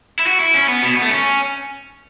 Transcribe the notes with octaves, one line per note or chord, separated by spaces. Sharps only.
E4
F#4
E4
C#4
B3
B2
B3
A3
C#4